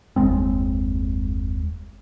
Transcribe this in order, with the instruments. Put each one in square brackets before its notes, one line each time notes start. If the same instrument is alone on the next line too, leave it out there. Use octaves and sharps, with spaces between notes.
[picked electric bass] F#1 D#2 G#3 C4